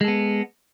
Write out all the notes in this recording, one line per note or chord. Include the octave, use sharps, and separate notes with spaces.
G#3 B3 A4